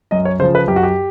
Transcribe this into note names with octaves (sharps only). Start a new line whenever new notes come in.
F#2 D#5
C#5
C#3 F3 C5
B4
F#2 G4
F#4
G4